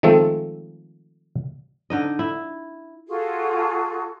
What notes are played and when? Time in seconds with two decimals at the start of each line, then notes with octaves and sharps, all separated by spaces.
0.03 D#3 F3 G#3 A3 C4 A4
1.90 D3 D#4 D#5
2.19 E4
3.08 F4 F#4 G#4 A4